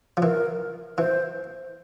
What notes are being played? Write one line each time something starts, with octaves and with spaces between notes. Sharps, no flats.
F3
E3 A#4
E3 C5